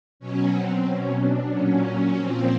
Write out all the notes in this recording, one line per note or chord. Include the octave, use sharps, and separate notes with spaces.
B2 F#3 C#4
C4
B2 F#3 C#4
D4
A#2 F#3 C#4
A#2 F3 C4